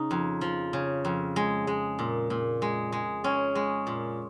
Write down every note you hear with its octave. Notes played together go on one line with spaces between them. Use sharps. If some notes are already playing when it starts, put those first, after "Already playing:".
Already playing: C#3 D#4
F2
F3
C#3
F2
G#3
G#3
A#2
A#2
G#3
G#3
G#3 C#4
G#3
A#2